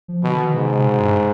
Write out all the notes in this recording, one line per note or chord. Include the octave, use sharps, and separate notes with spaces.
F3
B2 D3
D#3
G#2 C3
C3
B2
G2